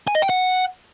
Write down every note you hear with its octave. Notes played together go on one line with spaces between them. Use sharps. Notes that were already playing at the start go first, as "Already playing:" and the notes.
G#5
D#5
G5
F#5